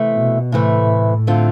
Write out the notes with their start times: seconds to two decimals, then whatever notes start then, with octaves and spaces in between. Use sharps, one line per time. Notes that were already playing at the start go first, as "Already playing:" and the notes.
Already playing: C3 E3 A3
0.16 B2
0.52 A2 C3 E3 A3
1.27 D3 A3 C4 F4